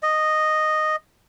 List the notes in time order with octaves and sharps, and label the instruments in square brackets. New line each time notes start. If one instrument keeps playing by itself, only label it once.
[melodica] D#5